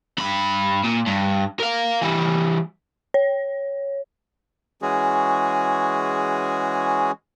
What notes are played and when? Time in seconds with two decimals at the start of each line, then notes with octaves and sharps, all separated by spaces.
0.18 G2 B5
0.85 A#2
1.07 G2
1.60 A#4 F5
2.02 E3 G3
3.14 C#5
4.82 E3 G#3 C#4 F#4 G#4